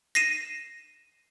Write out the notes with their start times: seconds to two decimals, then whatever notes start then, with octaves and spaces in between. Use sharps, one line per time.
0.15 A#6 C7 D#7 E7